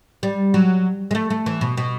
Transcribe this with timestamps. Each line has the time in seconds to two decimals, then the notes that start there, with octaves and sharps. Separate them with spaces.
0.23 G3
0.54 F#3
1.11 G#3
1.15 A3
1.30 A3
1.46 E3
1.61 B2
1.77 B2